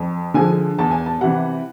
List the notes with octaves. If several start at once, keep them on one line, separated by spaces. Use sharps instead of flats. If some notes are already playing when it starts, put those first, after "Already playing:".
Already playing: F2
D3 F3 G#3 G#5
E2 A5
G#5
A5
C3 E3 G3 F#5